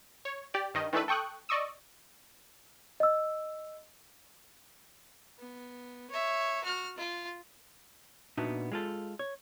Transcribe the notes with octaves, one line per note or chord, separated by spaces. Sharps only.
C#5
G4 D5
G2 D#3 D#5
D#3 E3 A3 D4 A4 B4
A4 G5 C#6 D#6 F#6
D5 D#5 C#6 D#6 E6
D#5 E6
B3
C#5 E5
F#4 F6
F4
A#2 B3 D4 D#4 F#4 E5
G#3 F4 A4
C#5